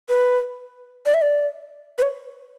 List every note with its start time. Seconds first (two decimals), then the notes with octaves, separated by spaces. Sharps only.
0.09 B4
1.06 D5
1.14 E5
1.22 D5
1.98 B4
2.02 C#5